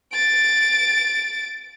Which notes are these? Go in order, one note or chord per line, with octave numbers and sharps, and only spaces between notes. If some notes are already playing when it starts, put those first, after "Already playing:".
A6 D7